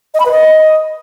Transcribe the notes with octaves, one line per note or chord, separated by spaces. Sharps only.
D#5
B5
B4
D#5